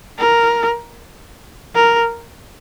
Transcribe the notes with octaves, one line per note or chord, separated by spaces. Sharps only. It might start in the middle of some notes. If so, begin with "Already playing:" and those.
A#4
A#4